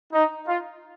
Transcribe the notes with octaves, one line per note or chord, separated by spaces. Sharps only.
D#4
F4